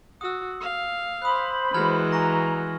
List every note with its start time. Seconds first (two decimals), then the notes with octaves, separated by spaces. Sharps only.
0.21 F#4 D#6 E6
0.61 F5
1.22 C5 B5 D#6 F#6
1.74 E3 G#3 F#4 A#5 F6 G#6
2.12 G#5 A#5 C#6 A#6